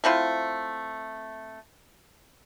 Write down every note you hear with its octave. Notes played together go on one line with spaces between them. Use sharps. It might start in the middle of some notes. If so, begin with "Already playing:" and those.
A3 C4 E4 F4